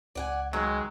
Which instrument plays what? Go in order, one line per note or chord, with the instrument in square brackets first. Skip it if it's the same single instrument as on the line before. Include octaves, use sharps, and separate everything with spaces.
[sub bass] C#2 [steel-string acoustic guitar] D5 F#5 G#5
[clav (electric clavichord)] D#3 F#3 [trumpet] G#3 [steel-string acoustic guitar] A#4